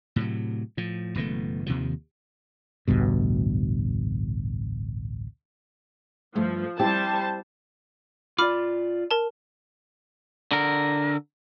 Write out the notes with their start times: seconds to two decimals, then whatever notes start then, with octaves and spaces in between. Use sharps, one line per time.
0.16 A2 C3 F#3
0.77 A2 F3
1.15 F#1 B2 E3 A3
1.66 D#2 C3 D#3 F3
2.88 A1 D2 G2 B2
6.35 G2 F3 A3
6.79 G3 C4 E4 G4 C5 A5
8.38 F4 D5 B5 D6 F6
9.11 A#4 A5
10.51 D3 A#4